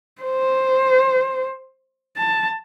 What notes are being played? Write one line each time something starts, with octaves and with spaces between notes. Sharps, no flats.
C5
A5